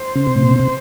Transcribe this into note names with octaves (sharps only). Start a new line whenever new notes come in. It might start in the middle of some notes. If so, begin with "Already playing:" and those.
Already playing: C5
C#3
C3
A2
A#2
B2
C3